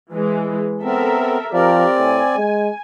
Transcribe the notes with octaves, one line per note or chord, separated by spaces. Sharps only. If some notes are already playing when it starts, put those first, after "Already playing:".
E3 G#3
B3 C4 A4 A#4 E5
F3 C4 G4 A#4 D5
A2 G#5
G#3